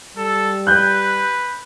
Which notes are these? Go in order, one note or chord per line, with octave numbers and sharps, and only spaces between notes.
G3 A4
B4 F#6 G6